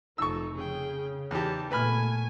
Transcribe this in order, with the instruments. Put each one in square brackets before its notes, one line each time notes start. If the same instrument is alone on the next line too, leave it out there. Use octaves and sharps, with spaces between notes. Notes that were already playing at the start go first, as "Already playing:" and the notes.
[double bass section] F1 F3 [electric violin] D#4 A4 [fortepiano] C#6 E6
[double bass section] C#3 [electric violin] G#4 G5
[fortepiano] E2 G4 [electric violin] D#4 A5
[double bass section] A#2 A3 B3 [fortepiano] B4 B5 F6 [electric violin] G#5